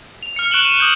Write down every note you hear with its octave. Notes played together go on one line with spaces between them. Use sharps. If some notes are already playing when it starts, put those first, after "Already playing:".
F7
F6 C#7
C#6 F#6 D7 E7 F#7 G7
D#7 E7
D6 D#6 G6